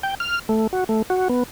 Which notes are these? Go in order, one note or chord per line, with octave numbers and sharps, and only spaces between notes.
G5
F6
A3
F#4
A3
F#4
B3